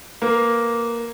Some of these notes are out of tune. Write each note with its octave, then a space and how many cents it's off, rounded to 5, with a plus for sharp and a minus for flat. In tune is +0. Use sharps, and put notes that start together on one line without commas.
A#3 +0 B4 +0